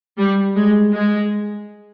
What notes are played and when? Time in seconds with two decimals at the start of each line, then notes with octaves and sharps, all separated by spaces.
0.18 G3
0.56 G#3
0.93 G#3